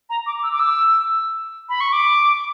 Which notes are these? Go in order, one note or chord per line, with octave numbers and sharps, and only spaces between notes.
A#5
D6
E6
D6
E6
B5
C#6
D6